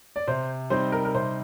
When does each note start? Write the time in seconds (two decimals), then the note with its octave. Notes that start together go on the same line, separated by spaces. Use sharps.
0.16 D5
0.28 C3 C5
0.70 G3 C4 D#4 C5
0.92 A#4
1.05 A#4
1.14 C3 C5